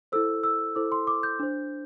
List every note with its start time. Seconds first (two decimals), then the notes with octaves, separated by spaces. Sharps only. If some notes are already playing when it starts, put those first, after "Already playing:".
0.12 E4 A4 C5 E6
0.44 E6
0.75 E4 A4 C5 D6
0.92 C6
1.07 D6
1.23 G6
1.39 D4 C5